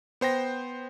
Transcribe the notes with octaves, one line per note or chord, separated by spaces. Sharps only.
B3 C5 G5 A#6